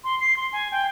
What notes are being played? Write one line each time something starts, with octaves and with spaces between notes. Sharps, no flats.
C6
C7
C6
G#5
G5